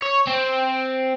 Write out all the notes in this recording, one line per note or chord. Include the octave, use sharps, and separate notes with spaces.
C#5
C4